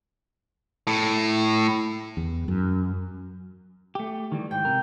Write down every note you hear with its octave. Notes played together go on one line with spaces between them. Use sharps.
A2
E2
F#2
A3 G4
D#3 E3 G3
G#2 G5
C3 A#4